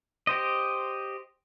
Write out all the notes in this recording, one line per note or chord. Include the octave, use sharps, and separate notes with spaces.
G4 C5 D#5